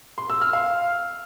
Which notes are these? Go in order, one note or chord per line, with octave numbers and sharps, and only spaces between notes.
C6
E6
F6
F5